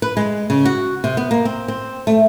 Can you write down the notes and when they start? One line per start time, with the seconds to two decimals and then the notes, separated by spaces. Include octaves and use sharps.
0.02 B4
0.17 G#3
0.50 C#3
0.65 F#4
1.04 C3
1.17 B3
1.31 A#3
1.45 C4
1.68 C4
2.07 A3